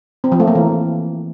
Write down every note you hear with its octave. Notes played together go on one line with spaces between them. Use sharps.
C4
F3
A3
A#3
E3